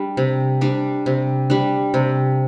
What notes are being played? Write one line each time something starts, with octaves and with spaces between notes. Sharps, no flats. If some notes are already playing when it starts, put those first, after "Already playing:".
Already playing: G3 D4
C3
G3 D4
C3
G3 D4
C3